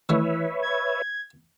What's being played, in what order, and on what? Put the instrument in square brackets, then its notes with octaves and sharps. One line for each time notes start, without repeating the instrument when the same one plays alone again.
[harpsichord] D#3 A3 D4 [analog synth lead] E3 [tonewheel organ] B4 C#5 E5
[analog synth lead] G#6